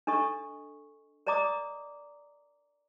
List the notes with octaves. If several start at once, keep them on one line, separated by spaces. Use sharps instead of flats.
D4 A4 D#5 C#6
A#4 D5 D#5 A#5 D6 D#6